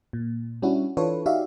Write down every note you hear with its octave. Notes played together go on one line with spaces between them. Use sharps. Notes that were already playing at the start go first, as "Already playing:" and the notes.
A#2
G3 C#4 D4 E4 F#4
E3 D4 F4 A4 B4 C#5
D#4 F#4 G4 D5 E5 F5